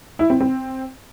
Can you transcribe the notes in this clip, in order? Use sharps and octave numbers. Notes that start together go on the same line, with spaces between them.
E4
C4
C4